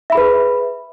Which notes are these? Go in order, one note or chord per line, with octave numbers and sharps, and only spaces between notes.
G#4 B4 E5 B5